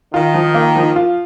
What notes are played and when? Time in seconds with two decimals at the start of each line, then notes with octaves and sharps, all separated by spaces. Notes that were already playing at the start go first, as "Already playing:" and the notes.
0.13 D#3 F4
0.34 F3
0.54 A#3
0.76 F3
0.96 F4